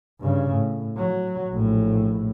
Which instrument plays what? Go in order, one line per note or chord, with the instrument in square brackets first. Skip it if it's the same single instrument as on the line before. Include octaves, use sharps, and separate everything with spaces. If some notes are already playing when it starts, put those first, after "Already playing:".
[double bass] G2 C#3
A2
F#3
A#1 A2